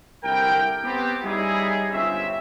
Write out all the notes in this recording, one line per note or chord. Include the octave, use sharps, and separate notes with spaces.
C2 D3 E4 A#4 G5
B3 C4 G4
G3 C#4 D#4 E4 G#4
G1 C#2 C4 C#4 E5